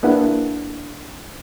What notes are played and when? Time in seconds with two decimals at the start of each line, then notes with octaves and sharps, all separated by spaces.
0.03 A#3 D4 E4 G#4 B4 F#5